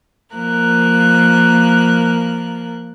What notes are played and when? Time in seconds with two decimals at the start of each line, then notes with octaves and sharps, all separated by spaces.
0.35 F3 A#3 A#4 F#6